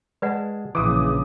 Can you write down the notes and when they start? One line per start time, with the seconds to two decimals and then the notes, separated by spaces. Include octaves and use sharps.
0.22 G#3 B4 D5 F#5 A5
0.75 A#1 C#3 E3 D6 D#6